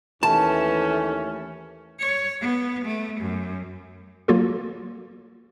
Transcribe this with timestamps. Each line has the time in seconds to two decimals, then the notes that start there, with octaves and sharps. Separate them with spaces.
0.23 D#2 E3 A3 C#4 A5
2.00 C#5
2.41 B3
2.86 A3
3.21 F#2
4.28 F#3 A#3 F4 F#4 A4